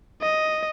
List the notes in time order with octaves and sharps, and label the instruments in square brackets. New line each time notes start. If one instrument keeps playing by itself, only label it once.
[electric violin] D#5